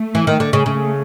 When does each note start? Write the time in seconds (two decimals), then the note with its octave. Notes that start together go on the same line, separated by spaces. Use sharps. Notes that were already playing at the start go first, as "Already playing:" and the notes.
Already playing: A3
0.15 E3
0.27 D#3
0.40 D3
0.53 C#3
0.66 C#3 A3